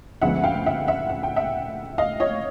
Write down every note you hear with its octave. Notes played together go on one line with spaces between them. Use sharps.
D2 C#3 F3 G#3 B3 E5 F#5
F5 G5
E5 F#5
E5 F#5
F#5
G5
E5 F#5
D#5 F5
C#5 D#5